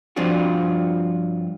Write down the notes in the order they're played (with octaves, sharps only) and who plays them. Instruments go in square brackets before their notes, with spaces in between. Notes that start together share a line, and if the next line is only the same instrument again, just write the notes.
[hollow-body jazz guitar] G2 F3 C4 D4 F4 F#4